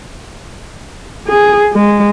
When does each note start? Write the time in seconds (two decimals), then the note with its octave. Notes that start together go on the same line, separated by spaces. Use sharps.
1.28 G#4
1.73 G#3